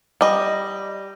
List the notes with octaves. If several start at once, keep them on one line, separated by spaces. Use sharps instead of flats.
G3 D#5